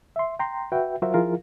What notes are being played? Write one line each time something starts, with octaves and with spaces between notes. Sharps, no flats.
E5 C6
G5 A#5 C6
F#4 B4 E5 G5
F#3 F4 F#4 A#4 C5 E5
F3 E4 F4 G#4 A#4 F5